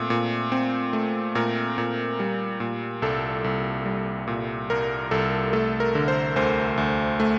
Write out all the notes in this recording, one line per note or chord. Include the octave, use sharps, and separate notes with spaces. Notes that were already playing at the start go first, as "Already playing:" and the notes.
Already playing: A#2 A3 C4
A#2
C4
A3
A#2 A#4
A#2
G3
A#2
C2 A4
C2
G3
A#2
C2 A#4
C2 A4
A3 A4
A#4
D3
C5
D2 C5
D2
A3